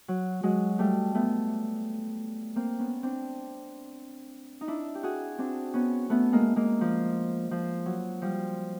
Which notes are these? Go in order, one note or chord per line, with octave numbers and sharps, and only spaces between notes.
F#3
F#3 G#3
G3 A3
A3 B3
A#3 C4
B3 C#4
C4 D4
D#4
D4 E4
G4
F#4 G#4
C4 D4
B3 C#4
A3 B3
G#3 A#3
G#3 A#3
F3
F3
F#3
F3 G3